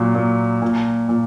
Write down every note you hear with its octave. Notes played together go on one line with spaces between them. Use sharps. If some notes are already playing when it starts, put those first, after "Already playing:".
Already playing: A#2 F#3
A#2
A#2
A#2